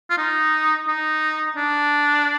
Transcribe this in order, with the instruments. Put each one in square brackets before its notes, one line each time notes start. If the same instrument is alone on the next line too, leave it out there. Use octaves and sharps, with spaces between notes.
[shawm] F4
D#4
D#4
D4